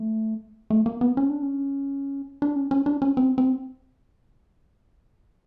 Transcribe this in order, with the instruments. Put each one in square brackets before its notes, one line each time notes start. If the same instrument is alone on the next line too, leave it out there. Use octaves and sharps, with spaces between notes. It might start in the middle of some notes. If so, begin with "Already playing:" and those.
Already playing: [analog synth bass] A3
A3
A#3
B3
C#4
D4
C#4
D4
C#4
C#4
D4
C#4
C4
C4